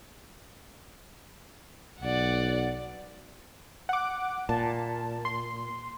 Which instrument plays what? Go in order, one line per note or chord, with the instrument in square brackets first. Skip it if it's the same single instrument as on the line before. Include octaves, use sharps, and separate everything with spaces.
[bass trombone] B1 [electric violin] D5 F#5
[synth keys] F#5 D6
[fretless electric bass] A#2 [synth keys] A5
[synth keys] C6